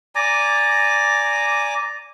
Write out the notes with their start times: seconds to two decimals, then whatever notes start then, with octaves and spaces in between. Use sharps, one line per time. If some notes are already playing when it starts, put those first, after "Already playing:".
0.15 D5 G#5 A#5 D6